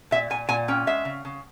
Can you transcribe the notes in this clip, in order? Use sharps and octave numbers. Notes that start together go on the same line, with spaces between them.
A#2 E5
A#2 G#5
A#2 G#5
C#4 G5
G#3 E5
C#3
C#3